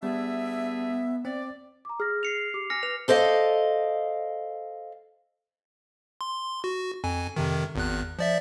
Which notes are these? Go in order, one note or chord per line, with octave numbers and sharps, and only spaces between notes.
G3 B3 D4 G#4 E5
C4 D5
A#5 D6
G#4 F6 A#6
C7 C#7 F7
G4 D6
G#5 F6 A#6 C#7
B4 F7
A4 C5 D5 D#5 F5
C6
F#4
F2 G#5
F2 C3 D#3
G#1 E2 F#6
F3 D5 E5